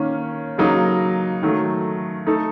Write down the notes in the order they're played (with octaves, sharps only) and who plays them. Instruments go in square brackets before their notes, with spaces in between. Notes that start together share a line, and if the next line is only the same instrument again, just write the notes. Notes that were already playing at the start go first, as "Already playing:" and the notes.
Already playing: [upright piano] D#3 A#3 C#4
C#3 F#3 A#3 D#4
D#3 F#3 A3
A3 D#4 A4